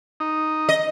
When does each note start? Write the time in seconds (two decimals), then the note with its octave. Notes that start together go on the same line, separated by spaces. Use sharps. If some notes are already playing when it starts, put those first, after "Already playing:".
0.20 D#4
0.69 D#5